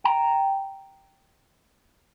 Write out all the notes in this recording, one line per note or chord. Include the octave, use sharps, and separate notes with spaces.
G5 A#5